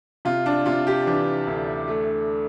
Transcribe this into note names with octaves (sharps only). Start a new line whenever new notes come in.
C3 F4
D4
C3 F4
G4
E3 D4
D2
A3